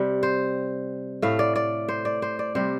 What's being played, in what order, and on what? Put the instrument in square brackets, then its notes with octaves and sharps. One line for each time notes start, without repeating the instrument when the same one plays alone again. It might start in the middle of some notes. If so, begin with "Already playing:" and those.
Already playing: [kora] C3 G3 C4
C5
A2 A3 F5
D5
D5
C5
D5
C5
D5
C3 G3 C5